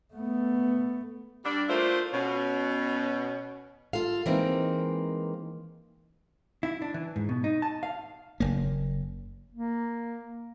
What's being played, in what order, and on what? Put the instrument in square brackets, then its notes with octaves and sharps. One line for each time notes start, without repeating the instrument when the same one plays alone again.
[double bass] A3 B3
[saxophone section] G3 D4
A3 A#3 D4 E4 F4 C5
B2 C#4
[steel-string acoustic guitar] F4 A4 F5
E3 G#3 A#3 C4 D#4
[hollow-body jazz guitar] E4
D4
E3
G#2
B2
D#4
A5
F5
[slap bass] F#1 A#3
[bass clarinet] A#3